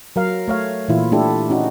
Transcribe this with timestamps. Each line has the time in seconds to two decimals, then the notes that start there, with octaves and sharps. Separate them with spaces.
0.16 F#3 A#4 F5
0.48 A3 C#5 F5
0.88 A#2 E3 E4 F4
1.12 A3 D4 E4 G4 A4
1.50 C#4 D#4 F#4